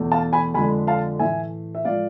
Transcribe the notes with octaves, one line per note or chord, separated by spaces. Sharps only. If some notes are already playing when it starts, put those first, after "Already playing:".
Already playing: E2 B2 A3
F5 A5
G#5 B5
F2 D3 G#3 G#5 B5
F5 A5
A2 E3 A3 E5 G#5
E5
A2 F3 G#3 D5 F5